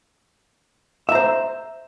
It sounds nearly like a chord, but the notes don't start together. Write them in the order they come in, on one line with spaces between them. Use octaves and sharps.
E5 A#5 C5